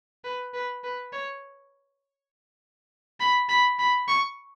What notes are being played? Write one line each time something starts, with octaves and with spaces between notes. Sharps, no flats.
B4
B4
B4
C#5
B5
B5
B5
C#6